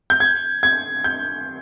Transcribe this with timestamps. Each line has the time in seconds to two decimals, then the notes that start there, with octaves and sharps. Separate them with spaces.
0.10 G6
0.20 G#6
0.63 G#6
1.04 G6